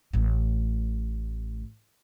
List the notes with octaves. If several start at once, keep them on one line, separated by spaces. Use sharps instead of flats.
A1 A2